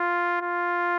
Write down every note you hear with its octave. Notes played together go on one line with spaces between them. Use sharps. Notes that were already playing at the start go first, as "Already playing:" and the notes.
Already playing: F4
F4